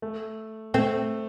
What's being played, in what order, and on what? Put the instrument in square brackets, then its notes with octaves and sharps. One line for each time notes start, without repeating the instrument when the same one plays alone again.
[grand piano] A3
[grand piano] A3 [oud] C4